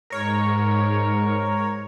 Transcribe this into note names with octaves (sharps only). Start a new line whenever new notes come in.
G#2 A#4 C#5